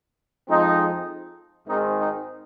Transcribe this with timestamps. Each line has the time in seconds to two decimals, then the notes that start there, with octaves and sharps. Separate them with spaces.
0.49 F2 F3 G#3 C4 D#4
1.68 G#1 G#2 D#3 G#3 C4 D#4
1.98 D#4